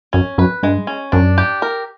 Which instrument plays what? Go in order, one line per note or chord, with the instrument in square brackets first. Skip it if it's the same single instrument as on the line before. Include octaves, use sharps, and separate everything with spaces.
[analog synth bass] F#2 [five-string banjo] C#4
[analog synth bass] F#2 [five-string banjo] B4
[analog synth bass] G2 [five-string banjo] G#3
[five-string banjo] C#4
[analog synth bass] F#2 [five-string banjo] D4
[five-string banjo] G4
A#4